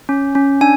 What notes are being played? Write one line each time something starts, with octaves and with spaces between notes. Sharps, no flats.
C#4
C#4
D4 G#5